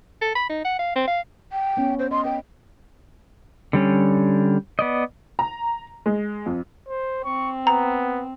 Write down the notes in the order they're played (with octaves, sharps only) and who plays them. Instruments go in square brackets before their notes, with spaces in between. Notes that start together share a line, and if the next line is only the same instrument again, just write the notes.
[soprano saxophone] A4
B5
D#4
F#5
F5
C4
F5
[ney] G5
[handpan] B3 C#4
[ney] C5
[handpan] D#5 [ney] C6
[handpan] B4 [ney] G5
[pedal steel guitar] D3 G3 C#4
B3 D5 D#5
[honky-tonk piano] A#5
G#3
F2
[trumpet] C5
[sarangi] C4 [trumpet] C#6
[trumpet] B3 [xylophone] A#5